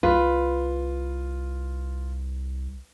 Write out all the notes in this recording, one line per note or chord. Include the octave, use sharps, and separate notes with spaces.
C2 F4 B4